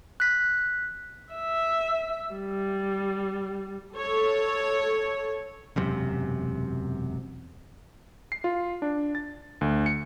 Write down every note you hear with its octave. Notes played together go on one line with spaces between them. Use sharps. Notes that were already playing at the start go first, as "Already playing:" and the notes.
F#6 B6
E5
G3
A4 C#5
E1 F#2 C3
C7
F4
D4
A6
D2
C#7